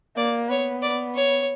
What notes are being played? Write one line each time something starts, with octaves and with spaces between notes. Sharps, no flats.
A#3 D5
B3 C#5
D5
C#5